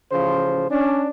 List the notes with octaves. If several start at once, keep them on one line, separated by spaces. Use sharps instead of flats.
A1 C#3 F3 C5
C#4 D4